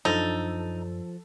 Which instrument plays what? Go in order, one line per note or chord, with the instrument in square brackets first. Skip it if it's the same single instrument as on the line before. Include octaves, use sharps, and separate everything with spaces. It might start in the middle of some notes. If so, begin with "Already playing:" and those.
[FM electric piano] F#2 D4 [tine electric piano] F3 [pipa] D#4 [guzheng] A4